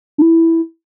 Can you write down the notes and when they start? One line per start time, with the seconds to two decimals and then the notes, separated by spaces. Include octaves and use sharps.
0.18 D4
0.22 E4